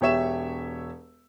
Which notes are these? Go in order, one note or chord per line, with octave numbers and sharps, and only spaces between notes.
E1 G4 C#5 E5 E7